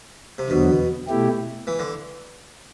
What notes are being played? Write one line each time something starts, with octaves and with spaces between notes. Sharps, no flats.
C3
E2 B2 D3 F#3 B3
B2 A3 E4 G4
E3
D3